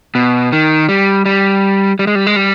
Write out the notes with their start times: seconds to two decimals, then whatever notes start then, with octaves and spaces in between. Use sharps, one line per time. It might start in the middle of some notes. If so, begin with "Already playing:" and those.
0.15 B2
0.52 D#3
0.89 G3
1.25 G3
1.99 G3
2.07 G#3
2.15 G3
2.27 G#3
2.36 G3